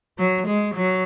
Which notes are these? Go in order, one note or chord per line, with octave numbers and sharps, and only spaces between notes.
F#3
G#3
F#3